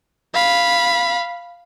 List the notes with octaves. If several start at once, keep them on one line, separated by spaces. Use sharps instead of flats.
F5 B5